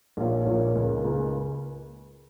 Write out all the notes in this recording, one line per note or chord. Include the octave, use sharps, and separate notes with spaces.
A#1 A#2 A#3 F4 C#5
A#1 A#2 A#3 F4 C#5
C#2 C#3 A#3
C#2 C#3 A#3